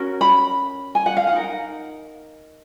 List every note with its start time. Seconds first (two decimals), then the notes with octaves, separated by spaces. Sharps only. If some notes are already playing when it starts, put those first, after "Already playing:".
Already playing: C#4 F#4 A#4
0.21 B5
0.95 G#5
1.06 F#5
1.17 F5
1.27 F#5
1.32 D#4 A#4